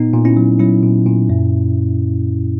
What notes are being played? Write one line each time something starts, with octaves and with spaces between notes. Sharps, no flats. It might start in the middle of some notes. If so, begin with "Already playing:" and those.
Already playing: A#2 B3 D#4
A#2
C#4 E4
F#3
F#3 C#4 E4
A#2
A#2
F#2